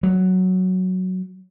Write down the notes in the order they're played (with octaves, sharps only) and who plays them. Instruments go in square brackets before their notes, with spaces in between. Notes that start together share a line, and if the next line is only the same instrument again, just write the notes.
[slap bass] F#3